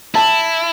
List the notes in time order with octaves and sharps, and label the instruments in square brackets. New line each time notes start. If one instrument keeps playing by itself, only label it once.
[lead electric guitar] E4 [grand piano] A5